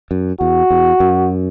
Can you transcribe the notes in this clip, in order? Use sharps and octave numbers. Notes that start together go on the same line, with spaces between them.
F#2
E2 F#4
E2
F#2